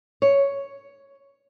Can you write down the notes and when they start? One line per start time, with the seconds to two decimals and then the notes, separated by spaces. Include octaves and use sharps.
0.22 C#5